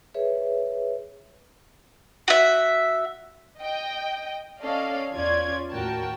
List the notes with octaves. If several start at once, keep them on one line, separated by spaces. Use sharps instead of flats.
G#4 B4 C#5 E5
F#4 E5
D#5 G5
C#4 A4 D5 D#5 F5
E2 C#4 F4 D5 G#6
D#2 A2 F#4 A#4 G5 A5